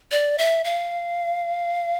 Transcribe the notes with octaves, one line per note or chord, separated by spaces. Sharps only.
D5
E5
F5